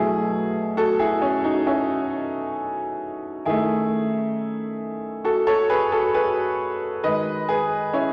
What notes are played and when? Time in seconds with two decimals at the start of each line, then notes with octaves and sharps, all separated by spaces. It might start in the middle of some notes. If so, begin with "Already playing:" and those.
Already playing: B2 F#3 A3 E4 G#4
0.77 F#4 A4
0.99 E4 G#4
1.22 C#4 E4
1.44 D#4 F#4
1.67 C#4 E4
3.45 D#3 A3 E4 G#4
5.24 F#4 A4
5.47 A4 C#5
5.70 G#4 B4
5.92 F#4 A4
6.15 G#4 B4
7.04 D#3 G#3 B4 D#5
7.49 G#4 B4
7.93 C#4 E4